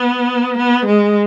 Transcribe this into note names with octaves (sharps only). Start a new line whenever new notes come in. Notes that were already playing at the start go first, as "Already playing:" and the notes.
Already playing: B3
B3
G#3